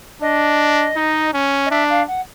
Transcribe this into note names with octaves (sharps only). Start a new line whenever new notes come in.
D4 D#5
D#4
C#4
D#5
D4 E5
F5
F#5